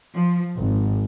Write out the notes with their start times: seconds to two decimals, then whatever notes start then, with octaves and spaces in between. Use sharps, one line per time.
0.15 F3
0.57 G#1